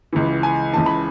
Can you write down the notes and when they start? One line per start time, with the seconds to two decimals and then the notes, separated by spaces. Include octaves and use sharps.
0.13 C#2 C#3 E3
0.43 G#5
0.73 C#2 C#3 E3 A5
0.86 B5